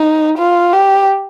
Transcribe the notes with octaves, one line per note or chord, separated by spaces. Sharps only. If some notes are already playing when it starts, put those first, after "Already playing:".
Already playing: D#4
F4
G4